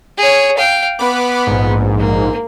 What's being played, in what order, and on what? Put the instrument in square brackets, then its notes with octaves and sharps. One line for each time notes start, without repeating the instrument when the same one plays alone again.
[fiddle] G#4 C#5
F5 G5
[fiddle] B3 [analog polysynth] B4 B5 D6
[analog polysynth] A#1 G#2
[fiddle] A#3